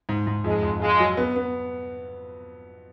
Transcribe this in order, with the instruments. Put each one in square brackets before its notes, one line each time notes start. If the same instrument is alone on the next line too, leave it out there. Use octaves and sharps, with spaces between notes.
[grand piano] G#2
G#2
[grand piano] F2 [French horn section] G#3
[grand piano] F2
[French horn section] G#3 [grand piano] F4
[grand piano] F#3
B3
B3